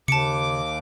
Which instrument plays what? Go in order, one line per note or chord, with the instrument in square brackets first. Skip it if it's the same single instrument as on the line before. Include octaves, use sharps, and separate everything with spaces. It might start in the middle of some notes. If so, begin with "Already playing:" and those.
[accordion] D#2 D6 [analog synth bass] C#3 [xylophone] A5 C#7